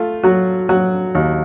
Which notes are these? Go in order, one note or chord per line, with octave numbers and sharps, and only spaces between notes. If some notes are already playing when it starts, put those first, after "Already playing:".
Already playing: A3 F4
F#3 F#4
F#3 F#4
D#2